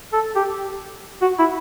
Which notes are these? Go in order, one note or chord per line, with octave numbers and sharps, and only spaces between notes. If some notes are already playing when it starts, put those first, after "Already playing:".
A4
G4
F#4
E4